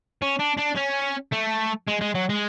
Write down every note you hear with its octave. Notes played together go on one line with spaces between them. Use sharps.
C#4
D4
D4
C#4
A3
G#3
G#3
F#3
G#3